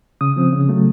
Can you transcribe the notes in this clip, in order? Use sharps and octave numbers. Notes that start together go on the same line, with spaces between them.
C#3 D#6
F3 C4
C#3
F#3 A3